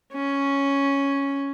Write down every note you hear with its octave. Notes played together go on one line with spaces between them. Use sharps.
C#4